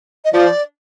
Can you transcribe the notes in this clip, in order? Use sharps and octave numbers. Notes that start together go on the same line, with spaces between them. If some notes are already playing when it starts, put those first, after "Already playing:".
D#5
F3 D5